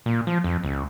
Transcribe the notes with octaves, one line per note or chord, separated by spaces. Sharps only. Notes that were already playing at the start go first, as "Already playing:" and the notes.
A#2
F3
F2
C#2